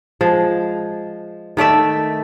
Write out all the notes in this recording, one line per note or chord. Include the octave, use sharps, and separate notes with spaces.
F3 G#3
D#3 A3 D5 E5